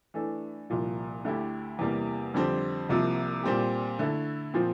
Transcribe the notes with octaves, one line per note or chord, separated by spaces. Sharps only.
E3 A3 D4 A4
C2 A#2 F3
D2 D3 A3 E4 G4
E2 C3 G3 A#3
F2 D3 G3 C4 G4
C2 C3 F3 A#3
A#2 G3 C4 G4
D3 A3 E4 A4
A#2 F3 C4